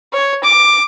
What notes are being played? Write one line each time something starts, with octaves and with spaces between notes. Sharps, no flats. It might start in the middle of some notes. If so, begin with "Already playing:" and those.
C#5
D6